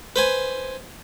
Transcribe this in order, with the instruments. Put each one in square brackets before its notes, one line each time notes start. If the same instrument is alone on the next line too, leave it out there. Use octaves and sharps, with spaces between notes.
[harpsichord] B4 C5 G#5